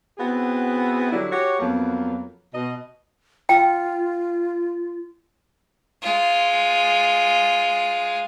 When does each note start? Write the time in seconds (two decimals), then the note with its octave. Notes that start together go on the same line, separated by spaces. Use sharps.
0.18 B3 C4 E4 F#4 G#4
1.12 D3 F#3 G3 D4 E4
1.31 F#4 G4 C#5
1.59 F2 F#3 A#3 B3
2.54 B2 D#5
3.49 F4 G5
6.02 G#3 F4